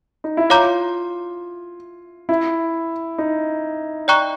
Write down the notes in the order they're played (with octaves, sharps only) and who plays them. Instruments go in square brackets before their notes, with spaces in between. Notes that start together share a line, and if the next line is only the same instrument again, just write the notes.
[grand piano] D#4
E4
[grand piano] F4 [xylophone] C#5 F5 A#5 D6 G6
[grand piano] E4
D#4
[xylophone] D5 G5 A#5 C#6 F#6